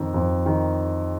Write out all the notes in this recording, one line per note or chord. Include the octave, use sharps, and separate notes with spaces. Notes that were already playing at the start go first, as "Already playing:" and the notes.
Already playing: F2 D#3
F2
D#3